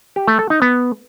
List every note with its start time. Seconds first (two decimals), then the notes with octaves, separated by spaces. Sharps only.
0.16 G4
0.28 A3
0.39 A4
0.50 D#4
0.62 B3